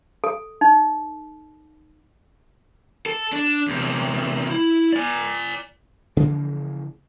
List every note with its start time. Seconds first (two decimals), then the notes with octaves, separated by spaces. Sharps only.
0.24 A4
0.61 D#4
3.06 A4
3.33 D4
3.68 E2 C3
4.51 E4
4.93 D5 G#5
6.17 C#3 E3 F3 A#3